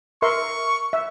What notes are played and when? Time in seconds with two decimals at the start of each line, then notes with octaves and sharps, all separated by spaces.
0.22 A#4 E5 C6 C#6
0.93 E5